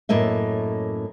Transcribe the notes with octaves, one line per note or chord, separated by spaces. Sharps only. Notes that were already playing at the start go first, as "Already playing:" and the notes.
F#2 A2 A#3 D#5 E5